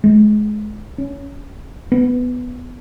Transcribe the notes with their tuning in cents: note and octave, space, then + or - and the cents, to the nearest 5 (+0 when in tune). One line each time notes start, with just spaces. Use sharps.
G#3 +30
C#4 +15
B3 +10